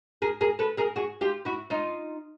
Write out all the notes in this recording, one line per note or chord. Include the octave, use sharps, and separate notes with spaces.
G#4 A#4
G#4 A#4
A4 B4
G#4 A#4
F#4 G#4
F4 G4
E4 F#4
D#4 F4